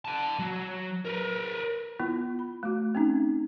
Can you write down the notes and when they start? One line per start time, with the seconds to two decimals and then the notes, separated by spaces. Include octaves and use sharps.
0.05 F#5 A5
0.39 F#3
1.05 A#4 B4
2.00 B3 E4 F4
2.39 B5
2.63 A3 F#4
2.95 C4 C#4 D#4